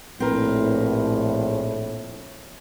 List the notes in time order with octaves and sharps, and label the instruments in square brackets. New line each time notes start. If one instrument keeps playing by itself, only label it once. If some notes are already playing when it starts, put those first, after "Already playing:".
[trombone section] A#1 A2 [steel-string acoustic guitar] C4 A#4 B4